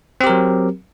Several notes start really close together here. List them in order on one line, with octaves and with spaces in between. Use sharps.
C4 G4 A#4 F#3